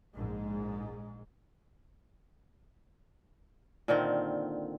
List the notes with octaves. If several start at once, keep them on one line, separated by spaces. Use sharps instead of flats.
A#1 G#2 G#3
A#2 D3 D#3 C4